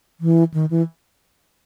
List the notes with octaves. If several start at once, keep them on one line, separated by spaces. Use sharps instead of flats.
E3
D#3
E3